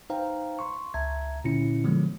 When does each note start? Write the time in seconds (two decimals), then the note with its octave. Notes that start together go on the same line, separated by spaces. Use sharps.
0.10 D#4 B4 C5 F5 G5 A#5
0.59 C6 C#6
0.94 C#2 E5 A5 A#5 G#6
1.44 A#2 D3 C#4 E4 C#7
1.84 D3 F3 F#3 G#3 B3